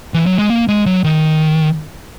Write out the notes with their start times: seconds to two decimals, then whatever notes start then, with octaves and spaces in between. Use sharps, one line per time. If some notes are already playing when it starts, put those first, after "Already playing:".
0.14 E3
0.26 F#3
0.38 G#3
0.50 A#3
0.68 G#3
0.86 F#3
1.04 D#3